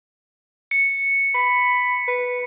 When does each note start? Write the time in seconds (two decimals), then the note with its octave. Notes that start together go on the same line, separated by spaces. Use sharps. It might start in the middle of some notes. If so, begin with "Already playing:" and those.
0.71 C#7
1.35 B5
2.08 B4